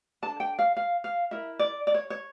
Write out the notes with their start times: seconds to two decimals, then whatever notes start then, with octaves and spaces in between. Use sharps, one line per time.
0.22 D4 A4 A5
0.40 G5
0.59 F5
0.77 F5
1.04 F5
1.31 E4 A#4 E5
1.59 D5
1.87 D5
1.94 C#5
2.10 C#5